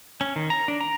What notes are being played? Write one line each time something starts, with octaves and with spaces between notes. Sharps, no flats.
C#4
D#3
A#5
D4
A#5